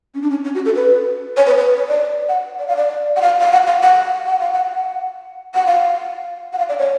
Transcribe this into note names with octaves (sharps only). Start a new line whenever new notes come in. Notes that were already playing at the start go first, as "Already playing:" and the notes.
C#4
D4
C#4
C#4
F#4
A4
B4
C#5
B4
B4
C#5
D5
F#5
D5
F5
D5
F#5
F5
F5
F#5
F5
F#5
F#5
F5
F#5
F#5
F#5
F5
F#5
F5
D5
C#5